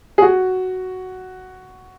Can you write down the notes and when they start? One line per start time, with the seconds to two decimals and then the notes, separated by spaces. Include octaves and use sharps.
0.18 G#4
0.22 F#4